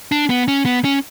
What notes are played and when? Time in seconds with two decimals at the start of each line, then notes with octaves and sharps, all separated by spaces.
0.12 D4
0.30 B3
0.48 C#4
0.66 B3
0.84 C#4